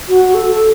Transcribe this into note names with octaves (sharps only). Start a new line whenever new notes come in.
F#4
A4